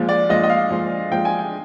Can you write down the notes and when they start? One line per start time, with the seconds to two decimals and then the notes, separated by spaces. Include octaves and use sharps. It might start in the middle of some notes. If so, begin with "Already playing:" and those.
Already playing: A#2 F3 G#3
0.09 D5
0.29 A#2 F3 G#3 D#5
0.44 D#5
0.50 F5
0.70 A#2 F3 G#3
1.11 A#2 F3 G#3 G5
1.25 G#5
1.39 G5